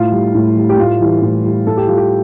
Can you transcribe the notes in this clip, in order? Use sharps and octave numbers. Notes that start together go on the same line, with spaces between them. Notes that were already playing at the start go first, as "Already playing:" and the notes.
Already playing: A2 F4
G3
A2
G3
G4
A2 F4
E3 G3
A2
E3 G3
A2 A4
G4
G3 F4
G4